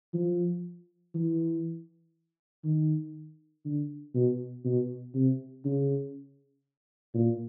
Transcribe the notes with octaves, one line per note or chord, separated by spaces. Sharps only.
F3
E3
D#3
D3
B2
B2
C3
C#3
A#2